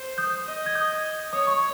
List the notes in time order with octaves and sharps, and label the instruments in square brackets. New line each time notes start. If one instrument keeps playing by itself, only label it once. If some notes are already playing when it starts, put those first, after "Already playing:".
Already playing: [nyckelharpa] C5
[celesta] D#6 G6
[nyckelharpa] D#5
[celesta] G#6
D#6 G6
[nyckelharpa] C#5 [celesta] D#6
[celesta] C#6